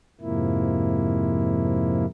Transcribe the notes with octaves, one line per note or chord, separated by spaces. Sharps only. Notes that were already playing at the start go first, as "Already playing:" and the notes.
F2 G#2 C3 F3 A#3 E4